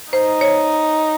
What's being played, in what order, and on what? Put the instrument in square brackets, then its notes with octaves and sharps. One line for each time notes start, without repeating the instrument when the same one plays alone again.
[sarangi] D#4 [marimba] C5
[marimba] C#5